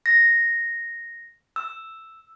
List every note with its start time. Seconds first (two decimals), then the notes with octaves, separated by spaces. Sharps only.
0.06 A#6
1.56 E6